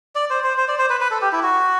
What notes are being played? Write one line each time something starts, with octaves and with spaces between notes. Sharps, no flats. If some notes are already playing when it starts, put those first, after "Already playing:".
D5
C5
C5
C5
D5
C5
B4
B4
A4
G4
E4
F#4